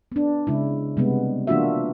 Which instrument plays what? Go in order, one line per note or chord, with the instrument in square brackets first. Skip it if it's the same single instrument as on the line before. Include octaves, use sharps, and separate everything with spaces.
[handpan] B3 D4
C#3 G#3 E4
C3 G3 G#3 B3
E3 A#3 D4 F4 F#4 E5